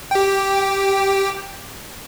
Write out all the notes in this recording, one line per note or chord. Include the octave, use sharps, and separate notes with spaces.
G4 G5